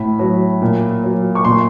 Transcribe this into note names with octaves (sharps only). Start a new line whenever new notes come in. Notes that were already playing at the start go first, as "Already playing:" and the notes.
Already playing: A2 B5
F#3
A#2
F#3
C#6
A#2 C6